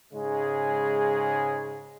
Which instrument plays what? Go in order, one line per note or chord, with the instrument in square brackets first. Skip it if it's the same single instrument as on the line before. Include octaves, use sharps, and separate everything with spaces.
[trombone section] G#2 C#3 G#3 G#4